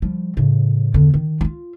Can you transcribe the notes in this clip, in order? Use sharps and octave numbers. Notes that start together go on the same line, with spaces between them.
F3 G3
A2 C#3
E2 D3
D#3
D#4 F4